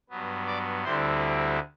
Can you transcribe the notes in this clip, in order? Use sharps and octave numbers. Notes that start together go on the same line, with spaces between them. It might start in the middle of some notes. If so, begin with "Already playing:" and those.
G2 F#3 B3
D5 D6
D2 D3 G3 C4 E4 C5 C6